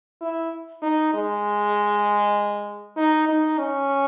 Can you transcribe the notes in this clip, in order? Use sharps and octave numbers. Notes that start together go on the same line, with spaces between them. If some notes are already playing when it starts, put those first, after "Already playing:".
E4
D#4
G#3
D#4
D#4
C#4